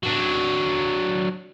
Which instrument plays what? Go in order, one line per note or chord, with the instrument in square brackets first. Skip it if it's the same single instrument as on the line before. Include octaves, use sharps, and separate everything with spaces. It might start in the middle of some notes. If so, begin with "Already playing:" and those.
[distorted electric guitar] F#3 D4